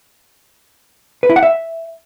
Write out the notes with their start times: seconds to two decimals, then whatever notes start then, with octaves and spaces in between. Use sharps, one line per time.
1.23 B4
1.30 E4
1.36 F#5
1.43 E5